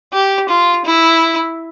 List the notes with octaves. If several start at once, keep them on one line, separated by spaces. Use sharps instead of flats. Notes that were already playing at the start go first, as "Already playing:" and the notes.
G4
F4
E4